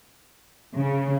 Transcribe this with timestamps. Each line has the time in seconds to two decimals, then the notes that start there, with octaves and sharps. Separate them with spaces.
0.76 C#3